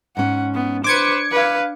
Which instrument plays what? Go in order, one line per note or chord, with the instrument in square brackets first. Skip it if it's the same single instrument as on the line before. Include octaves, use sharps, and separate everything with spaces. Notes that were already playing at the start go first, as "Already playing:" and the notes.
[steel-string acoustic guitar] G#2 C#4 [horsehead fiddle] F#5
[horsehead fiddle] B3
[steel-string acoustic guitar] D4 [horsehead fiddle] B4 C5 [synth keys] D6 G#6 C#7
[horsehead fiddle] B4 F5